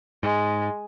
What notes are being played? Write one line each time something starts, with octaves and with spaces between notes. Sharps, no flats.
G#2 G#3